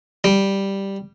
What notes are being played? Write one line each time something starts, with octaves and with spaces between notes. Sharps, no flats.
G3